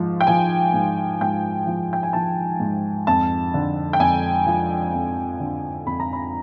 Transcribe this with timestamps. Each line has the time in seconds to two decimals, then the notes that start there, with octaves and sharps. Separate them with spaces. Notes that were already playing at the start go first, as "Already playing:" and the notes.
Already playing: G#2 F3
0.21 G5
0.27 F3 G#5
0.73 G#2
1.21 G#2 G5
1.67 F3
1.93 G5
2.03 G#5
2.13 F3 A5
2.60 G#2
3.07 F2 A5
3.54 D3
3.93 G5
3.99 F2 G#5
4.47 F3
4.94 F2
5.40 D3
5.86 F2 B5
6.00 A#5
6.13 B5